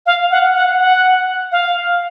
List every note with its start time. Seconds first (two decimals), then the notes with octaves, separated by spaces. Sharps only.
0.06 F5
0.31 F#5
0.55 F#5
0.80 F#5
1.52 F5